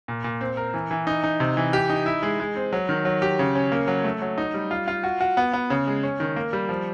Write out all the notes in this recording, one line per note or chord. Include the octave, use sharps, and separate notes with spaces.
A#2
A#2
C4
A#4
E3
E3
D#4
D#4
C3
E3
G4
D#4
E4
G#3
G#3
C4
F#3
D#3
F#3
G4
C#3
C#4
A#3
F#3
A3
F#3
D#4
G3
F4
F4
F#4
F#4
B3
B3
C#3
G#3
C#4
D#3
A#3
G3
F3